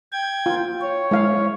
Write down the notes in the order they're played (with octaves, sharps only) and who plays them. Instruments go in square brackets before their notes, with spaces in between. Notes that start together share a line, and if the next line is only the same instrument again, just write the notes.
[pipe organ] G5 G#6
[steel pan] F4
[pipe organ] C#5
[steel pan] G#3 E4 F5